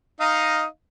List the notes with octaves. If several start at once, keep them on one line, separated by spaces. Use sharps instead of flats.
D#4 D#5 F5